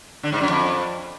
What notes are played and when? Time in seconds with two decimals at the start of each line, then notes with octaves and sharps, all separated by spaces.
0.23 D3
0.32 G#2
0.41 F#2
0.49 F2